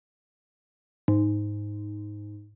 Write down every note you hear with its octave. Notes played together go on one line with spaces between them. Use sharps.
G#2